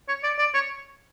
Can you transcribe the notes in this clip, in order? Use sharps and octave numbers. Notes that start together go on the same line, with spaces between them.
C#5
D5
D5
C#5